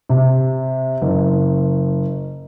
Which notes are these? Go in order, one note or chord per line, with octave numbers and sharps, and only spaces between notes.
C3
F#1